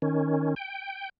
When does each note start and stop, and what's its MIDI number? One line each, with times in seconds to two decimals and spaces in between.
0.02 0.55 51
0.02 0.55 61
0.56 1.09 79